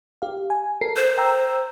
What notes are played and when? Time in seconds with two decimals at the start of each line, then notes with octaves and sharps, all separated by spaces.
0.22 G4 F5
0.50 G#5
0.81 A4 A#4 C7
0.96 C5
1.18 G5 A#5 E6